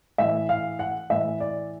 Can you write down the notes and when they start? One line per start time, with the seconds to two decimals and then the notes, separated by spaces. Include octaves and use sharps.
0.18 A2 E3 E5
0.49 F5
0.79 F#5
1.10 A2 E3 E5
1.40 D5